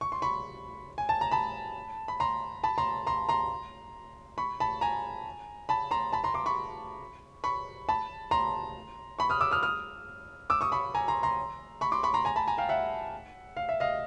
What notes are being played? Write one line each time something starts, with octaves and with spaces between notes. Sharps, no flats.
C#6
C6
B5 C#6
G#5
A5
A#5
A5 B5
B5
A#5 C6
A5 B5
A#5 C6
A#5 C6
A#5 C6
B5 C#6
A5 B5
G#5 A#5
A5 B5
A#5 C6
A5 B5
A#5 C6
C6 D6
B5 C#6
B5 C#6
A5 B5
A#5 C6
B5 C#6
D#6 F6
D6 E6
D#6 F6
D#6 F6
D6 E6
C#6 D#6
B5 C#6
G#5 A#5
A#5 C6
A#5 C6
B5 C#6
C6 D6
B5 C#6
A#5 C6
G#5 A#5
A5 B5
G#5 A#5
F5 G5
E5 F#5
F5
E5
D#5 F5